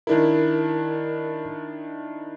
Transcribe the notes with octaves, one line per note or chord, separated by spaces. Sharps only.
D#3 D4 E4 A#4